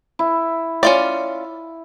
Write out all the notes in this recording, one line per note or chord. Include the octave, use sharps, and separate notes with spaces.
E4
C#4 F4 D5